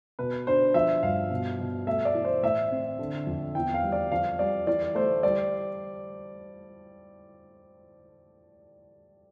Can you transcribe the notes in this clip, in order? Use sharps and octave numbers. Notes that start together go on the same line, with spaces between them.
B2 B4
D4 C5
F3 E5
G2 F5
B2
B2
A3 E5
D5
E3
C5
A2 E5
C4
D3
F2
E2 G5
F5
G3
D5
F2 F5
G3 D5
E3 D5
A3 C5
G3 D5